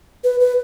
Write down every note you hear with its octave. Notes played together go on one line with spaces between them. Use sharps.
B4
B4